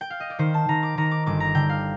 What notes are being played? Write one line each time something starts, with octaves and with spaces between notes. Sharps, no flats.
G5
F5
D#5
D5
D#3 C5
A5
D#3 A#5
D6
D#3 A#5
D6
G1 D6
A#5
D3 G5
F5